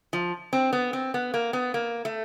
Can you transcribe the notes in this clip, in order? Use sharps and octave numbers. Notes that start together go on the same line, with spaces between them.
F3
C4
B3
C4
B3
A#3
B3
A#3
A3